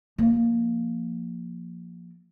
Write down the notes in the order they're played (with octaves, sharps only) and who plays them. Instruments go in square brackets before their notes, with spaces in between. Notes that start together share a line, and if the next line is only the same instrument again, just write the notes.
[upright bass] F3 A#3